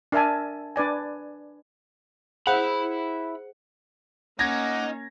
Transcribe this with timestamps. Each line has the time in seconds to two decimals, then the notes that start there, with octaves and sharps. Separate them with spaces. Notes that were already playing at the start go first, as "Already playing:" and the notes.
0.12 D4 A#4 E5 G#5 A5
0.76 D4 B4 D5 G#5
2.47 E4 G#4 C5 F#5 B5
4.39 A#3 C#4 D#4 F#5 D6 G#6 A#6